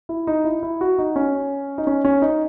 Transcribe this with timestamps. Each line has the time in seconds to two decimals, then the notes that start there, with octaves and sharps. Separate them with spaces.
0.09 E4
0.27 D#4
0.44 E4
0.63 E4
0.81 F#4
0.98 D#4
1.16 C#4
1.78 D#4
1.87 C#4
2.05 C#4
2.22 D#4